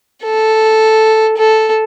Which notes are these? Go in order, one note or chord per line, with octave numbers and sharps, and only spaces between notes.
A4
A4